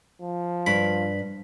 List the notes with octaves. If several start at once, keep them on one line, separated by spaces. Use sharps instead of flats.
F3
G2 B5